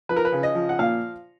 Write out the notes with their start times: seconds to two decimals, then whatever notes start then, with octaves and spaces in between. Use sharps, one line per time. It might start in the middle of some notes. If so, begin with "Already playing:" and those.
0.09 F3 B4
0.16 A#4
0.25 B4
0.32 C#3
0.43 D#5
0.55 F3
0.69 F#5
0.79 A#2 F5